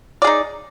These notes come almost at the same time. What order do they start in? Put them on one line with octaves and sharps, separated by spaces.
D5 G#4 D#4